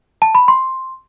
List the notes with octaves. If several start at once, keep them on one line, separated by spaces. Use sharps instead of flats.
A5
B5
C6